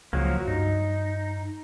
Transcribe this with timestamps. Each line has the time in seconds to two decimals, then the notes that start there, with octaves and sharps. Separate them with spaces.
0.13 C#2 F3 F#3 A#3
0.47 G2 D#4